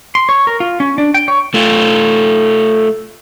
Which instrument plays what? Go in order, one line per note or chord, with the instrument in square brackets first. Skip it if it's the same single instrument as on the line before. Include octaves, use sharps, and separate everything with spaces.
[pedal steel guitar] C6
C#5
A#4
F4
C#4
D4
G5
C#5
[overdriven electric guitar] A3 F4